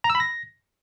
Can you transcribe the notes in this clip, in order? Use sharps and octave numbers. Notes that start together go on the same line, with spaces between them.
A#5
E6
B5
A#6